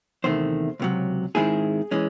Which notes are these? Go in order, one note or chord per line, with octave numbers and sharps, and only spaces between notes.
E2 C3 D#3 A3 C5
C#2 C3 F#3
G#2 D#3 G#3 C4 E4 G#4
E3 G#3 C#4